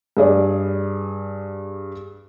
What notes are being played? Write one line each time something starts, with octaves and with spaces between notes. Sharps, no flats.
G2 G#4 D5